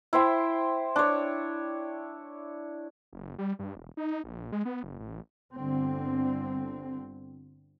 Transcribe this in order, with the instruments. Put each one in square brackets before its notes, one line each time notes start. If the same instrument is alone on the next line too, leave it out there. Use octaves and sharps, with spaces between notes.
[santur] E4 C5 E5 G5
D4 C#5
[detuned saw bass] F#1
G3
G2
E1
D#4
A#1
G#3
B3
F#1
A1
[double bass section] G1 D3 C4